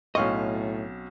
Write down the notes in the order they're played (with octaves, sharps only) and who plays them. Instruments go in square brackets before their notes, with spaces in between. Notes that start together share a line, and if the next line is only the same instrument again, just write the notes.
[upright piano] B1 F5 C#6 [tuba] A2 [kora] C4 C#4 B4 [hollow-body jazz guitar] D#5